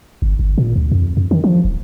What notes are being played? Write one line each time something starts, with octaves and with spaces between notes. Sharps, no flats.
G1
G1
A#2
D2
F2
F2
D#3
F3
D#1